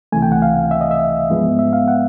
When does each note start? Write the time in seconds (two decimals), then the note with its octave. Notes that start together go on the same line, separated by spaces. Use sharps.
0.12 C#2 C3 E3 A3 G#5
0.22 G5
0.32 F#5
0.42 F5
0.71 E5
0.81 D#5
0.91 E5
1.30 G#2 F3 G#3 B3
1.59 E5
1.73 F5
1.88 F#5